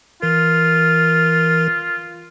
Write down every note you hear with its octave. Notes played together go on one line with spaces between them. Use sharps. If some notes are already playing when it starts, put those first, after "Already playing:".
E3 F4 A#4